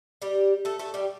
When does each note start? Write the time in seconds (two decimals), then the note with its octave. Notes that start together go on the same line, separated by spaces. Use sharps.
0.22 G3 G4
0.65 A3 A4
0.79 A3 A4
0.94 G3 G4